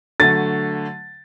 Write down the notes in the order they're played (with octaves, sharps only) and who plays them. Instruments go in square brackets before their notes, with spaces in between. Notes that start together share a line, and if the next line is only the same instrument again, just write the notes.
[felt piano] D3 F#3 A3 [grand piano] A6